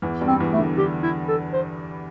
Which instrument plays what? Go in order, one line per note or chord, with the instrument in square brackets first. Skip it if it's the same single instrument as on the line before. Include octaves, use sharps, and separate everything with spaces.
[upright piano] E2 E3
G2 G3
[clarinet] C4
[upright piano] E2 E3
[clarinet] A3
[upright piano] D3
[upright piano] D3 [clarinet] G4
[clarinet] E4
A4
C5